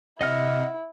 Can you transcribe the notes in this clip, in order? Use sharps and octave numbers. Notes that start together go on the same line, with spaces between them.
C3 E4 D#5 F#5 F6